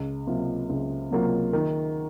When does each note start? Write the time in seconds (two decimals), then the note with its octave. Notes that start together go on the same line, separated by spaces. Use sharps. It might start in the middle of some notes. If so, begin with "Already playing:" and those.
Already playing: C#2
0.27 C3 F#3 A#3 F4
0.69 C#2
1.11 C3 F#3 A#3 F4
1.53 D#3